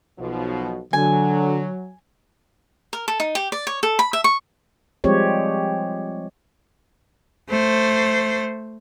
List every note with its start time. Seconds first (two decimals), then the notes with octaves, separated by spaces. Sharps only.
0.19 B1 B2 F3
0.93 D3 F#3 G#5
2.93 A#4
3.08 A4
3.20 D#4
3.35 G4
3.52 D5
3.67 C#5
3.83 A4
3.99 B5
4.13 E5
4.24 C#6
5.04 F3 G3 G#3 C4 G4 C#5
7.50 A3 C5